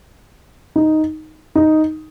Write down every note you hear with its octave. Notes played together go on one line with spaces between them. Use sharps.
D#4
D#4